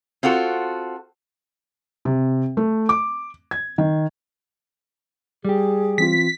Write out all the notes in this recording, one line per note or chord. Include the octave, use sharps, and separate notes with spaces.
C4 F4 F#4 A4
C3
A3
D6
G#6
D#3
G3 G4 G#4
E3 C4 F4 B6